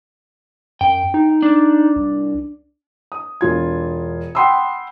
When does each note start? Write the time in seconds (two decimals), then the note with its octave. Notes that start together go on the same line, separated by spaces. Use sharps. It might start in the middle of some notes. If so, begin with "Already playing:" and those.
0.81 F#2 G5
1.14 D#4
1.42 D4
1.96 C2
3.12 D#6
3.41 E1 F4 G#6
4.35 F#5 G5 B5 C6 D#6 E6